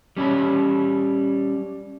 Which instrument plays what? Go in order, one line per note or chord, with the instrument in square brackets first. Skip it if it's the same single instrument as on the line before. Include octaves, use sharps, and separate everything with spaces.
[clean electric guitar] G3 C#4 C#5 B5